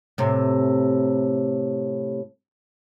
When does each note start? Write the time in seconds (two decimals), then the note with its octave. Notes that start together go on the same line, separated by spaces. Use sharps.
0.18 A2 C3